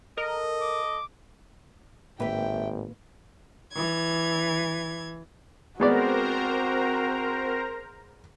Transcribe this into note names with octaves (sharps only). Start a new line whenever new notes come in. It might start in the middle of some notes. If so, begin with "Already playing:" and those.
A4 A#4 D#5
D6
G#1 A2 A#3 G4 B4 E5 G5
E3 G#6
G#3 B3 C4 F#4 A#4 C5 D5 A#5